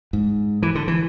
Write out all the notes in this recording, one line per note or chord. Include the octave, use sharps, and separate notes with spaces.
G#2
E3
D3
E3